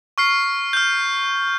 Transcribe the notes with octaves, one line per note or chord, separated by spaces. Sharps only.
C#6 F6 C7
F6 G6